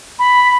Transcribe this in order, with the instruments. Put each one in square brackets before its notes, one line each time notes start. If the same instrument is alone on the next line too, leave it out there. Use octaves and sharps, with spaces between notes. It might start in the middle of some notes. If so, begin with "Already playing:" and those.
[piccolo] B5